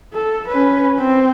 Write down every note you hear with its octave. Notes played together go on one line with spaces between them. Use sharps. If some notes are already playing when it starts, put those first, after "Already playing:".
A4
C#4 B4
C4